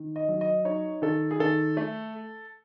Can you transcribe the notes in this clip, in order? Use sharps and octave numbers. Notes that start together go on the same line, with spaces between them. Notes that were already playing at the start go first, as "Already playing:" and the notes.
Already playing: D#3
D#5
F#3
D#5
D#4 C#5
D#3 A4
G#4
D#3 A4
A3